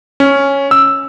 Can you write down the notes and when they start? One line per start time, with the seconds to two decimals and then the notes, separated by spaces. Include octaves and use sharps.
0.20 C#4
0.71 E6